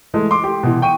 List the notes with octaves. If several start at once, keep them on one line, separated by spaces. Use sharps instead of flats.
E3 G#3 A3
C6 D6
G4
B2 E3
G5 C#6 D#7